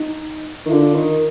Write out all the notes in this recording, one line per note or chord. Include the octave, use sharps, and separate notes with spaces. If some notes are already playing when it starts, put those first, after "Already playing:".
Already playing: D#4
D#3
E4
D3 F4
D#3